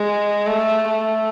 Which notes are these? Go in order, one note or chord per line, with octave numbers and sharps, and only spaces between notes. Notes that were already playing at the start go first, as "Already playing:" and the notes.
Already playing: G#3
A3
A3